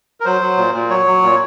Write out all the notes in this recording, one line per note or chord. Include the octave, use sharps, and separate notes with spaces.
A#4
F#3 C5
F#3
A#2
A#2
F#3 C#5
F#3
A#2